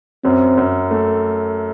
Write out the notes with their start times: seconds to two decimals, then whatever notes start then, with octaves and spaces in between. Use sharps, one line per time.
0.24 F#2 C4
0.57 F#2
0.91 A3